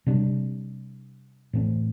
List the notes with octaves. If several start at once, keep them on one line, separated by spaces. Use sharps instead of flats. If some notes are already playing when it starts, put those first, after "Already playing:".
C3 G3 D4
A2 E3 A3 C4